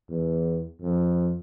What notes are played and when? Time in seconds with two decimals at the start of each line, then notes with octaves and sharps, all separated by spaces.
0.09 E2
0.81 F2